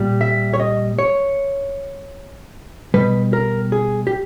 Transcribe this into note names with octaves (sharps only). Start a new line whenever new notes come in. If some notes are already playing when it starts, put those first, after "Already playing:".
Already playing: A#2 G3
E5
C#5
D#5
C#5
B2 G3 B4
A#4
G#4
G4